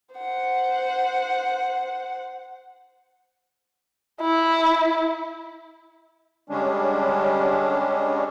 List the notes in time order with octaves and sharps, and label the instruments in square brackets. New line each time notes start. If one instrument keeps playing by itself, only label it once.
[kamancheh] C5 F#5
[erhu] E4
[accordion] D3 G3 G#3 C#4 D4